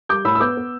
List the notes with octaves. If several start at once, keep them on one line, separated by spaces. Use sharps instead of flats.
G3 D6 G6
A2 B5 E6
E6
B3 D6 G6
B3